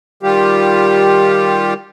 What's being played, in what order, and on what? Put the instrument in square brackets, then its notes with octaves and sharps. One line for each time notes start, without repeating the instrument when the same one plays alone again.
[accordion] D#3 G3 F4 G4